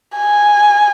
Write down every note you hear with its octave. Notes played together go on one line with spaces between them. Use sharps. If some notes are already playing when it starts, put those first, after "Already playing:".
G#5